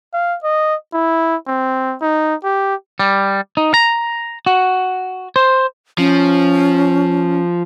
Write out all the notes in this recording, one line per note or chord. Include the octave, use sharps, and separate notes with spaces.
F5
D#5
E4
C4
D#4
G4
G3
D#4
A#5
F#4
C5
F3 C#4